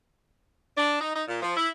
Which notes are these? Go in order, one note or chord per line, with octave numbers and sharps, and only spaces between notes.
D4
D#4
D#4
A#2
F3
E4